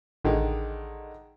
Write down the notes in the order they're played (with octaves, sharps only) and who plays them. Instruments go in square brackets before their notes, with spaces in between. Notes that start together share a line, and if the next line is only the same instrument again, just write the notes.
[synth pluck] A1 [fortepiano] D3 D#3 G#3